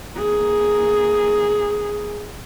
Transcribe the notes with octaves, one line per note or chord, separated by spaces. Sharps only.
A#3 G#4